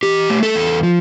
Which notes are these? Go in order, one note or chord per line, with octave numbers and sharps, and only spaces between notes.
E3 G4
A3
A4
E2
F3